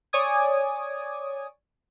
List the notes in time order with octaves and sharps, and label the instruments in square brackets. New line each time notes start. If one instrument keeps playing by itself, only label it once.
[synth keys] C#5 D5 G#5 D6 D#6 G#6